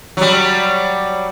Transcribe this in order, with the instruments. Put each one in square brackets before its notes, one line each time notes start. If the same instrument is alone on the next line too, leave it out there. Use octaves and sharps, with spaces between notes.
[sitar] F#3 G3